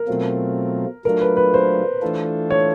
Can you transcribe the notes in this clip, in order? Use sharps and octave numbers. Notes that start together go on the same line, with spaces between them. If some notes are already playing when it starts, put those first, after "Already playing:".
Already playing: A#4
B2 F#3 A3 C4 F4
F#3 A3 D4 F4 A#4
B4
B4
C5
E3 A3 D4 F4 A4
C#5